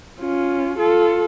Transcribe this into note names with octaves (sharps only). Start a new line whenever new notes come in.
C#4 F4
F4 A4